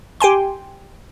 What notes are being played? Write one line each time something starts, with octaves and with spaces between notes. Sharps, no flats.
G4 G5 G#5 C6